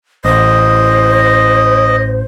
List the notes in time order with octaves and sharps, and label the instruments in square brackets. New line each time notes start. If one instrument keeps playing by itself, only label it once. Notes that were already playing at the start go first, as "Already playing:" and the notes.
[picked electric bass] A1 [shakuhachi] C5 [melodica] D#5